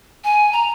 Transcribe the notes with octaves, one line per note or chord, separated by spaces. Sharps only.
G#5
A#5